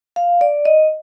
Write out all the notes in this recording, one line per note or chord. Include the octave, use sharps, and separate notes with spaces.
F5
D5
D#5